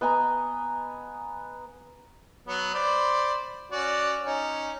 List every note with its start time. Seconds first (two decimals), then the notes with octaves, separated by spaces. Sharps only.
0.01 B3 D#5 G#5 A#5
2.47 F#3 B3
2.74 C5 D5 B5
3.72 C#4 F#4 D5
4.26 C#4 D#4